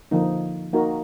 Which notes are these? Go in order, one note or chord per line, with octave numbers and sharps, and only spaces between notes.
D3 F3 A#3 D#4
A#3 D#4 F#4 A#4